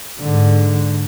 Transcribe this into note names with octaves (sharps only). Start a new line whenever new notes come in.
G#2 D3